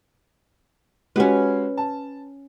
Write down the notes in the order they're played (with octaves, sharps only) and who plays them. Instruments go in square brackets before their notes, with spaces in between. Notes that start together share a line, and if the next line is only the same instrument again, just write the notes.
[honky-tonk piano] G#3 F#4 G4 [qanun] C#4 B4
[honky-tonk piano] A5